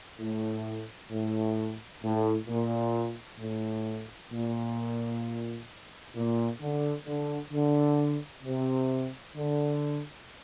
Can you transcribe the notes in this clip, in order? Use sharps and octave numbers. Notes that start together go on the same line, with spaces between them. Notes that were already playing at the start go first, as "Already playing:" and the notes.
A2
A2
A2
A#2
A2
A#2
A#2
D3
D3
D3
C3
D3